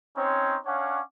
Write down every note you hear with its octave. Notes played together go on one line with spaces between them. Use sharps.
C4 C#4 D#4 C5 C#5
C#4 D4 C#5 F5 F#5 D6